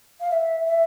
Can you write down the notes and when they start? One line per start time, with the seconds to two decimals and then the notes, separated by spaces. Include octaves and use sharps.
0.20 F5
0.30 E5
0.66 E5